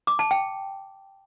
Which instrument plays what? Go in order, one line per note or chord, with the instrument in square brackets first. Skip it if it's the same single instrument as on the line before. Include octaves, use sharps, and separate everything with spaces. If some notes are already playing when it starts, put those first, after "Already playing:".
[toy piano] D6
A5
G5